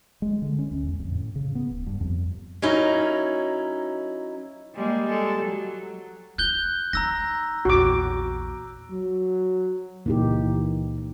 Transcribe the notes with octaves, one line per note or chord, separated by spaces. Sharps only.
G#3
D3
C#4
D2
E2
F2
A2
C#3
B3
D1
G2
F2
F#3 C#4 D#4 E4 A#4
G3 G#3 A#3
G#3 A4
F#3
F4 F#6 G6 G7
D#4 A#5 E6 A#6
A#1 E2 F#4 D6
F#3
C#2 A#2 E3 A#3 D#4 G4